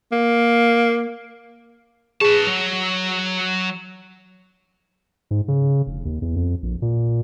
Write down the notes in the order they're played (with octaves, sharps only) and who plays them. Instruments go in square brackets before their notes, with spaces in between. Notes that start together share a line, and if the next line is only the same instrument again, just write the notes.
[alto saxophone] A#3
[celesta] G#4 [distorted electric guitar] B4 A5
[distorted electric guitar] F#3 [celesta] F7
[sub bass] G#2
C#3
F1
D#2
E2
F2
A#1
A#2